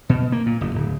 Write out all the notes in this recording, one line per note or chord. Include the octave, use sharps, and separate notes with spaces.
B2
A#3
A#2
F#1
D1